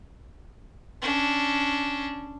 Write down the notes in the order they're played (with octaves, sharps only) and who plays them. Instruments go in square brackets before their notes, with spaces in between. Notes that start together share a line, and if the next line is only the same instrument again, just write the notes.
[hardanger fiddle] C#4 D4